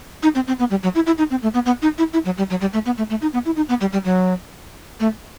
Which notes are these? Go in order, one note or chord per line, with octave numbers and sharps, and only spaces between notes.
D#4
C4
C4
B3
G3
F#3
E4
E4
D#4
C4
A3
B3
B3
D#4
E4
E4
F#3
G3
F#3
G3
A3
B3
A3
A3
D#4
B3
E4
D#4
B3
G3
G3
F#3
A3